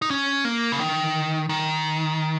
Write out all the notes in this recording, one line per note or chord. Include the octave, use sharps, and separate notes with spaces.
D#4
C#4
A#3
C#3
D#3
D#3